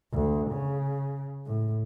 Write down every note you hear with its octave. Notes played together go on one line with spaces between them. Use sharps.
D2
C#3
A2